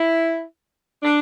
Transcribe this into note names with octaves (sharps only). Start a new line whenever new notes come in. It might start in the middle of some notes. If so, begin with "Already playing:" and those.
Already playing: E4
D4